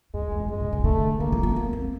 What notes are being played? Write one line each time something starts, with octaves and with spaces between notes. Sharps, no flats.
F#2 G#3
F2
E2
G2
F#2 G#3
B2
D3
D3 A3
D#3 A#3
F3
B3
B3
C4